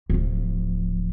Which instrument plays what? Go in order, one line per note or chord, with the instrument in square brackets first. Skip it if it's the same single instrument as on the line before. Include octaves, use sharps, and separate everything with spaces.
[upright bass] D1 F3